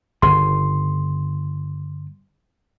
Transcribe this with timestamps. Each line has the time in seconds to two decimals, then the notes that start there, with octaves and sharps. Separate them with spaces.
0.22 G1 C#3 C6